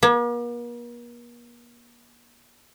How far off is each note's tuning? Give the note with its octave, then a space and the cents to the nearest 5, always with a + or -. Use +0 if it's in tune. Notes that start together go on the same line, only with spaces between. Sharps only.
A#3 +45